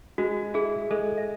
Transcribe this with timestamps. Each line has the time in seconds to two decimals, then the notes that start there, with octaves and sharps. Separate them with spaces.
0.18 G#3 F#4
0.54 E4 G#4
0.91 G#3 A4
1.18 E5